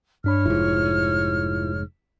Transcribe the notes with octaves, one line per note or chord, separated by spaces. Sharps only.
G2 D4 C#5 B5 F6
F1 G#2 E4 F4